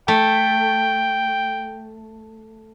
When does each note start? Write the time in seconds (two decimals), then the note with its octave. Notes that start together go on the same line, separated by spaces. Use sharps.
0.08 A3 G5